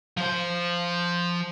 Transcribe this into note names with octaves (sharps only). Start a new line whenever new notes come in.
F3 C5